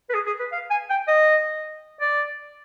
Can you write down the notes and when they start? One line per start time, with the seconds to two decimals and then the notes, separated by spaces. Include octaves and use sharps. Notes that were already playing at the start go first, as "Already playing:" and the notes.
0.10 B4
0.14 G#4
0.27 G#4
0.39 B4
0.52 F5
0.70 G#5
0.90 G5
1.08 D#5
2.01 D5